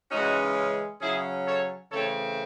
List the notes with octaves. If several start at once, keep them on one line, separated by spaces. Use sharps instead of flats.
C#3 E3 G#3 C#4 D#4 F#4
C#3 F#3 C#4 E4 G#4
A4 C#5
C#3 E3 A3 C4 A4 C#5